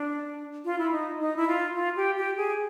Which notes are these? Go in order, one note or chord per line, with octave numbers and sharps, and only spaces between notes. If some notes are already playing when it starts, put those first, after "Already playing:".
Already playing: D4
F4
E4
D#4
D#4
E4
F4
F4
G4
G4
G#4